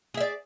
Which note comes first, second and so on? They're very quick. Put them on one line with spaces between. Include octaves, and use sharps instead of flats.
G#4 E5 D5